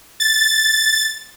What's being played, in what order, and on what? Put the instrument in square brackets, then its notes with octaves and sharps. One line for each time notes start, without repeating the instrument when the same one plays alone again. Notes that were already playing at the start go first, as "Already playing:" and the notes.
[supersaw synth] A6